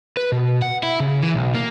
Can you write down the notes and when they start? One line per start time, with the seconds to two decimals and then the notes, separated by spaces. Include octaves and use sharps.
0.17 B4
0.32 B2
0.62 F#5
0.83 E4
1.00 C#3
1.22 E3
1.34 B1
1.55 A#3